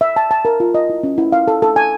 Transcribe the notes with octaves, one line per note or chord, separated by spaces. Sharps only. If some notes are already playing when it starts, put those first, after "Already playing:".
E5
A5
A5
A#4
F4
D#5
E4
C#4
E4
F5
A4
A4
G#5